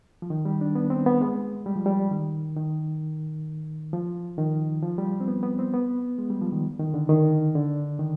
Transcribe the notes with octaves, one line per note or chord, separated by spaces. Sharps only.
F3
D#3
G3
D4
B3
C4
B3
G#3
G3
F3
G3
D#3
D#3
F3
D#3
F3
G3
C4
B3
B3
C4
B3
G#3
G3
F3
D#3
D#3
D3
D#3
D3
D#3